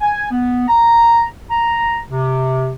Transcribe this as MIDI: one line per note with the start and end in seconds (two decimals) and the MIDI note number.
0.01 0.30 80
0.31 0.66 59
0.68 1.23 82
1.50 2.00 82
2.10 2.74 48